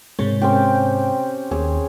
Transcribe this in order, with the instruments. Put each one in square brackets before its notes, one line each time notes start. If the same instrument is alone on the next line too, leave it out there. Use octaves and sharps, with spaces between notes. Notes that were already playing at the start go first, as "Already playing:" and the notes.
[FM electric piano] G#2 C3 G#3 [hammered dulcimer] C#5
[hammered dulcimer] C4 C#4 G4
[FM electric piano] D#2 [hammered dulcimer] G#4 C#5